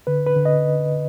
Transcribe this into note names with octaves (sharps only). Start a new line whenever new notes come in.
D3 B4
B4
D3
D#5